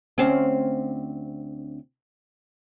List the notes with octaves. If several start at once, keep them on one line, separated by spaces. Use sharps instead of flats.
D2 C4 C#4